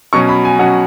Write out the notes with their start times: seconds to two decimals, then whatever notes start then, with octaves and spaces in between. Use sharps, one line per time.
0.13 B2 F#3 C#4 C#6
0.29 B5
0.45 G#5
0.59 B2 F#3 C#4 F#5